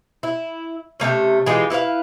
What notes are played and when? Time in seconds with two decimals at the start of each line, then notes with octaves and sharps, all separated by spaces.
0.23 E4
1.00 C3 A3 A#3 C#4
1.46 E3 G#3 F4 G4
1.70 E4 B4 C#5 F5